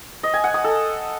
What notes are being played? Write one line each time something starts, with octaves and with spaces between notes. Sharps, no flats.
D#5
G#5
F#5
D#6
A4